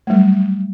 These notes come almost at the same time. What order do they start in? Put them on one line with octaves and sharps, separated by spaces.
A3 G3 F#3